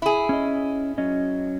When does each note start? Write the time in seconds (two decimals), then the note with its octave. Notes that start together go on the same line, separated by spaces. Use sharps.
0.02 E4 G#4
0.29 C#4 D#5
0.98 F#3 C#4 D#5